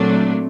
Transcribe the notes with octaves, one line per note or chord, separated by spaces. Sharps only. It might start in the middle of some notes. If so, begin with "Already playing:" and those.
Already playing: A#2 F#3 A3 C4 D4